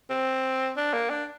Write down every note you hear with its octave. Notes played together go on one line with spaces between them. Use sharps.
C4
D4
A#3
D4